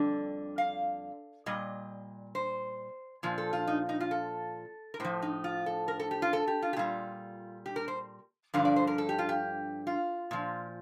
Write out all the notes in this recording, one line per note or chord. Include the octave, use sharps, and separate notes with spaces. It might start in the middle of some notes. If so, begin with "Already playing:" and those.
Already playing: F2 D3 G3 D5
F5
A#2 G3 D#5
C5
A#2 F3
A4
F4
D#4
D#4
F4
A4
A#4
A2 F3 C5
D#4
F4
A4
A#4
A4
G4
F4
A4
G4
F4
G4
A#2 G3 F4
G4
A#4
C5
G2 D3 F3 F5
D5
C5
A#4
A4
G4
F4
G4
F4
A#2 F3